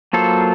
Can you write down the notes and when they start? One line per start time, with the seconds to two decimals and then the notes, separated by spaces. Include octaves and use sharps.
0.13 F#3 A#3 F4 A4 C5